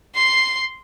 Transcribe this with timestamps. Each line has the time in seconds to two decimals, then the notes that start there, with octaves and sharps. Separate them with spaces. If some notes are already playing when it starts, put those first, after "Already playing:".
0.16 C6 C7